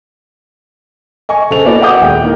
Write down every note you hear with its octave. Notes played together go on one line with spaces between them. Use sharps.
D#5 G#5 C#6
C#3 A4 C5 F7
A#3 B3 E4 F#4 D5 D#5
E5 F#5 D6 D#6 G6
D#1 G#3 G5
A#3 D#4 E4 A#4